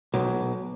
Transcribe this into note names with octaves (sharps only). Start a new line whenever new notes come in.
B1